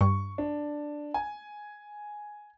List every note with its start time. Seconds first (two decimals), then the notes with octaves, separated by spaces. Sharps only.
0.01 G2 C#6
0.38 D4
1.14 G#5